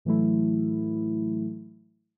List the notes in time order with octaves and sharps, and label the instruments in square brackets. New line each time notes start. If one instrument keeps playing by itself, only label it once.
[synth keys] A2 E3 F#3 A3 E4